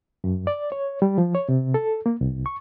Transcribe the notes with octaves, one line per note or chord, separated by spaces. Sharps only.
F#2
D5
C#5
G3
F3
C#5
C3
A4
A#3
C2
C#6